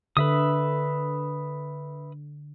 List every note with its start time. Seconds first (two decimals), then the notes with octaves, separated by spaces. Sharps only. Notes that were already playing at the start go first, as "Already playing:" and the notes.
0.17 D3 B4 E5 D#6